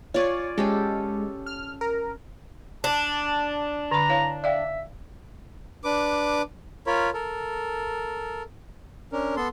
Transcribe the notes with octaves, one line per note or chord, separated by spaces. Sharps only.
F4 C#5 D5 G#5
G#3 C#4 G4 A4
F6
A#4
D4 A5
D3 A#5 B5
E4 C#5 F5
D5 E5 F5 G5
D4 B4 D6
F4 A#4 C#5 B5
A4 A#4
C#4 D4 A#4
B3 A4 C6